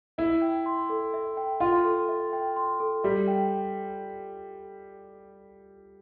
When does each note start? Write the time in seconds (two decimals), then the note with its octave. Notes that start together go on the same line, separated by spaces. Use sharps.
0.18 E4 E5
0.42 G5
0.66 C6
0.90 A4
1.14 E5
1.37 G5
1.60 F4 C6
1.85 A4
2.09 E5
2.33 G5
2.56 C6
2.80 A4
3.04 G3 E5
3.28 G5